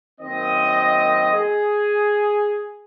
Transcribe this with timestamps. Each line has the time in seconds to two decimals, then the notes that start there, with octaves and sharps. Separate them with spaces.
0.21 F#2 D#3 A#3 C4 D#5
1.33 G#4